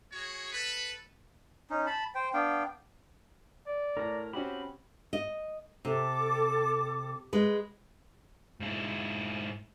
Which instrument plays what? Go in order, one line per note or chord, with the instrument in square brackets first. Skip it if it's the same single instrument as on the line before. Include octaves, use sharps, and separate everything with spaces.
[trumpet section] F#4 G#4 C#5
A4 B4
[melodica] C#4 D#4
A5 B5
C5 G5
B3 D4 F5 G5
[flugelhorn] D5
[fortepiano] A2 [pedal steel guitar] A#4 A#5
[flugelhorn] C4 [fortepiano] C#4 F#4 G4 [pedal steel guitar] B5
[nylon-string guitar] D#5
[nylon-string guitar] C3 [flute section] A4 D6
[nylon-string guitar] G#3 B4
[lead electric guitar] G#2 E4